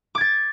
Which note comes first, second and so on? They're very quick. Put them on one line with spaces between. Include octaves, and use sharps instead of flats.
D6 G#6 A6